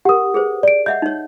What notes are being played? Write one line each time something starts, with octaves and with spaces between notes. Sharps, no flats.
G4 A#4 F#5 D#6
G#4 B4 C5
D5 D7
D#5 E5 F#5 G6
D#4 C#5